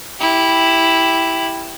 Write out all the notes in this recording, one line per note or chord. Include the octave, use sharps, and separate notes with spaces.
E4 G4